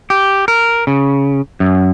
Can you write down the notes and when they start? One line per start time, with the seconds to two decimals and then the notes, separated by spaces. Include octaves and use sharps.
0.10 G4
0.48 A#4
0.87 C#3
1.60 F#2